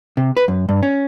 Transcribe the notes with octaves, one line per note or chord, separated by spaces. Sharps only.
C3
B4
F#2
G2
C#4